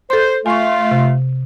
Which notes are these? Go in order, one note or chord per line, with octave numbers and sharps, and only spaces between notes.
A4 C5 C6
A3 F4 F5 G#5 C#6
C3